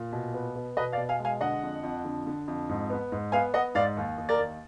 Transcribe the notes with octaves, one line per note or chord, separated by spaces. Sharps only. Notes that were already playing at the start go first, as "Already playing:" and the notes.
Already playing: A#2
B2
B3
B3
B2 B4 D#5
D5 F5
B2
F5 G#5
G#3
F5 G#5
D3 D#5 F#5
F2
F2
D3
D3
F2
G#2
B3
G#2
B3 F5 G#5
B3 D#5 F#5
G#2 D5 F5
D#2
D#2
A#4 D5
D#2